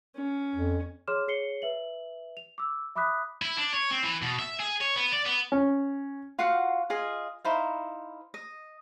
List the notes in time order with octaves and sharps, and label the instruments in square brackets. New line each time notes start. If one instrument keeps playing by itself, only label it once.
[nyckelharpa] C#4
[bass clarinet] F2
[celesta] G#4 C#5 C6 D6 F6 E7
G#4 C#5 C7 C#7 G7
B4 E5 F#7
F7
D6 E6
E5 B5 D6 D#6 F#6 B6
[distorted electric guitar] E4
D4
C#5
C4
E3
B2
E5
G#4
C#5
B3
D5
B3
[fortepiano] C#4
[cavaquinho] F4 F#4 F5 F#5
F4 G#4 D#5 F5
D#4 E4 C5 F5
D#5